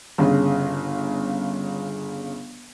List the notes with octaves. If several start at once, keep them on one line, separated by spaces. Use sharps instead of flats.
G1 C#3